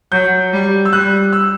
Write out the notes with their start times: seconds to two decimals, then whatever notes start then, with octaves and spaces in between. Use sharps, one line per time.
0.12 F#3 G6
0.53 G3
0.85 E6
0.93 G3 F#6
1.33 E6